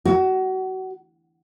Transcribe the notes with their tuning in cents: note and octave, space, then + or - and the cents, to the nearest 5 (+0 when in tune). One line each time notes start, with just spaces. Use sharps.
F#4 +25